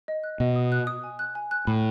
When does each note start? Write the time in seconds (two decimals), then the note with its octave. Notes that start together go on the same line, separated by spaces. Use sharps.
0.08 D#5
0.24 F#6
0.40 B2 D#5
0.56 D#6
0.72 F#6
0.87 D#6
1.04 G#5
1.19 F#6
1.35 G#5
1.51 F#6
1.67 A2 B5